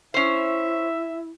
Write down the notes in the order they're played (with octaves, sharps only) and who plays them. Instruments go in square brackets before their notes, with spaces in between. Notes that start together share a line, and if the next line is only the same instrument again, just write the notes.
[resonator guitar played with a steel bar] C#4 C5 [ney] E4 [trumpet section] E5